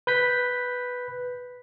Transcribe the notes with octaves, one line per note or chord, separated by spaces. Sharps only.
B4 G6 B6